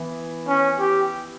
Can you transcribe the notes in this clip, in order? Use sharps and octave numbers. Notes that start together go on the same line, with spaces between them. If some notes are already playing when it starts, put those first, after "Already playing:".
Already playing: E3 B3 E4
C#4
G4